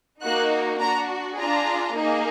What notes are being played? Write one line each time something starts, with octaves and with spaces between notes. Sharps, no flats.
A#3 D#4 F#4 F#6
D4 F#4 A#5
D4 F4 G#4 A#5
A#3 D#4 G#4